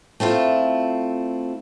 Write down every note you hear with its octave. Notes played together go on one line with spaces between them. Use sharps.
A3 C4 E4 F4 A4